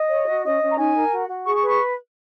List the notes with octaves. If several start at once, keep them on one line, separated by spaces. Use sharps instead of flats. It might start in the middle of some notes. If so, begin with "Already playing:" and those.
Already playing: D#5
C#5
F#4
C#4 D#5
C#4
A#5
D#4 G#5
A#4
F#4
F#4
G#4 C#6
C#6
B4
C#6